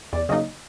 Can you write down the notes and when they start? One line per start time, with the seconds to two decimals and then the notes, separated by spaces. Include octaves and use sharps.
0.13 E2 D5
0.29 C#3 F#3 A#3 D#4 D#5